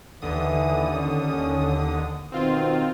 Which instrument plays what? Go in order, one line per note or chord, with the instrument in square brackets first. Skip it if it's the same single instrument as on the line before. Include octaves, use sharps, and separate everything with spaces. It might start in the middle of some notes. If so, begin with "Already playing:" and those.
[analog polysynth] D#2 D3 D#6 [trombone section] E3
[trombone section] C#4
[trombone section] B2 D#3 [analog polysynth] C4 F4